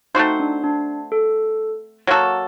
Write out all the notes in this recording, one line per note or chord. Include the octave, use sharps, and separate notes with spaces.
A3 C4 D#4 F#4 C5
D4
D4
A4
F#3 A#3 F#4 A4